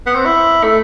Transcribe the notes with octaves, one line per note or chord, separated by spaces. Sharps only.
B3
C4
E4
A3